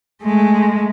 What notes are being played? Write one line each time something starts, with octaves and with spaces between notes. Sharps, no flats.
G#3 A3